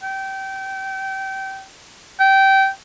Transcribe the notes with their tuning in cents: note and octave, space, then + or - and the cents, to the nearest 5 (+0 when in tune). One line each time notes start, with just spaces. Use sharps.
G5 -25
G5 -20